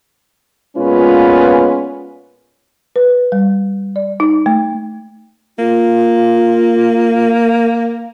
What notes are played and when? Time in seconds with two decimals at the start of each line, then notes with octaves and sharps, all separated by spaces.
0.76 A#2 G#3 B3 C#4 F4 B4
2.96 B4
3.32 G3
3.96 D5
4.20 D#4
4.46 A3
5.59 A#3 F4